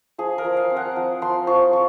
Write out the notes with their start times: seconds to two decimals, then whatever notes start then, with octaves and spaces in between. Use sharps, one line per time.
0.18 F3 G#4
0.38 A#4
0.44 F3
0.57 F5
0.70 C4
0.76 F#5
0.96 F3
1.22 F3 C6
1.47 F3 C#6
1.73 F4 C#6